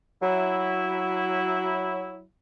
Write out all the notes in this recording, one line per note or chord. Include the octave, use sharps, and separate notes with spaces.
F#3 E4